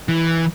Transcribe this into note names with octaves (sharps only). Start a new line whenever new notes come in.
E3